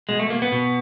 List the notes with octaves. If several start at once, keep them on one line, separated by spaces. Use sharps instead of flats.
B2 G#3
A3
A#3
B3
B2